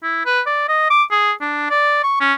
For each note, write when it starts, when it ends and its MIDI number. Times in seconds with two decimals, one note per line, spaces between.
0.03 0.24 64
0.26 0.41 71
0.46 0.64 74
0.68 0.90 75
0.90 1.03 86
1.11 1.32 68
1.41 1.67 62
1.70 2.01 74
2.03 2.20 85
2.21 2.34 61